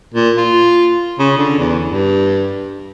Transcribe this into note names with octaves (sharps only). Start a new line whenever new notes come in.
A#2
F4
C#3
D3
E2
G2